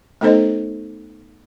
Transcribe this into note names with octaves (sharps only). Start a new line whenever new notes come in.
A3 B3 D#4 A4 C5 D#5